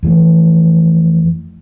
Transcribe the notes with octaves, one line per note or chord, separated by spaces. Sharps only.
F2 E3 A3